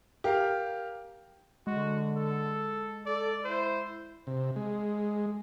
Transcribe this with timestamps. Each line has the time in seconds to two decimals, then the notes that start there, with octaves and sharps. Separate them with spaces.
0.24 G4 A#4 F5
1.67 D3 G#3 F#4
2.16 A4
3.06 A4 D5
3.44 E4 C5
4.27 C3
4.56 G#3